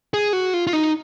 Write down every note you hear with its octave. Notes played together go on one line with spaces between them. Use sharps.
G#4
F#4
F4
F4
D#4